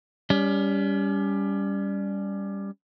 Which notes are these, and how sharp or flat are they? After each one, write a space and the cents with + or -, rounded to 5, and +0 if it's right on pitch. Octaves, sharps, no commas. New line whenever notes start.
G3 +15 C#4 +35